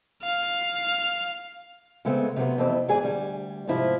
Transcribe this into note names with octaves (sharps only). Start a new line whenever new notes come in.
F5
C#3 G#3 A3 B3 C4
C3 F#3 B3
F2 E3 C4
E2 G#2 G#4 D5 G#5
D2 G3
G#2 C3 F3 E4 F4